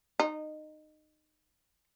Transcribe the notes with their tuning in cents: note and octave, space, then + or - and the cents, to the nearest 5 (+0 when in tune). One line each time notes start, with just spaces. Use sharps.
D#4 -20